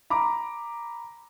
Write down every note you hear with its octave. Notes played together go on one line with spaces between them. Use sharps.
A#5 B5 D6